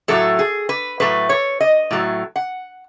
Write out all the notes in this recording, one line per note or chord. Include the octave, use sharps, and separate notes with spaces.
A2 F#3 A3 A4
G#4
B4
A2 F#3 A3 B4
C#5
D#5
A2 F#3 A3
F#5